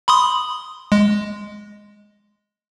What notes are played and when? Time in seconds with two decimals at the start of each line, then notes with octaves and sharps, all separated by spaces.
0.08 B5 C6 D#6
0.92 G#3